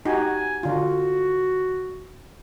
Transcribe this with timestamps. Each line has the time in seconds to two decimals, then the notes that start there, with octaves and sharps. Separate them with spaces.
0.05 D#4 F#4 G4 G#5
0.63 D3 F4 F#4